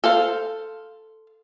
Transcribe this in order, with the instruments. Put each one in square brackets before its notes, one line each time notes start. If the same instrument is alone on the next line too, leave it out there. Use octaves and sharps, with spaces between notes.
[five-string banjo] A4 C5 F5